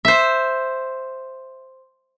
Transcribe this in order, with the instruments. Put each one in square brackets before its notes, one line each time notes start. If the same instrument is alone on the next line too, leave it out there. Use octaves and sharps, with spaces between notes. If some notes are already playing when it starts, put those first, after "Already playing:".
[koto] C5 E5